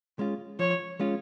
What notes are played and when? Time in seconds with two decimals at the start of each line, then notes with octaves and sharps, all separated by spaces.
0.19 G#3 C#4 F4
0.59 F3 C#5
1.00 G#3 C#4 F4